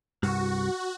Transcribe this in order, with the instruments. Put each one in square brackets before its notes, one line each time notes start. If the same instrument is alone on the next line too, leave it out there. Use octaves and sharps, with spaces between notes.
[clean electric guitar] C2 G2 [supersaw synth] F#4